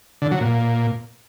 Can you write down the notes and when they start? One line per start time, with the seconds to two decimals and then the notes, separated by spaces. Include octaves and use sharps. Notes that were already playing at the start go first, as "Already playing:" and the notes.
0.22 D3
0.31 F#3
0.41 A#2